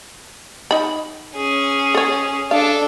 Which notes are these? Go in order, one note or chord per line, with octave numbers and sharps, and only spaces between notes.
D#4 B5
C#4 G#4
A4 C#5
D4 A4 F5